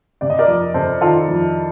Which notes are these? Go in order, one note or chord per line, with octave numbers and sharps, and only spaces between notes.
C3 D5
D#5
A#4 D5
F2
C3 A4 C5
D#3 F4 A4
F2